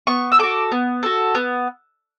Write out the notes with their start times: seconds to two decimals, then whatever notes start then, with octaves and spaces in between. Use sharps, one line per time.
0.07 B3 C#6
0.32 E6
0.39 F#4 A4 D6
0.72 B3
1.03 F#4 A4
1.35 B3